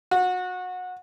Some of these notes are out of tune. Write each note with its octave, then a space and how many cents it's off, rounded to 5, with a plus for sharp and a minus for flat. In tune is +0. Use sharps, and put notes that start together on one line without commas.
F#4 -25